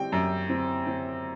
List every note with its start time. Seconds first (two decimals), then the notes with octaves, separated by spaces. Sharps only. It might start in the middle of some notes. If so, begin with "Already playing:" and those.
Already playing: G3 C4 G5
0.12 F#2
0.49 C4
0.87 C4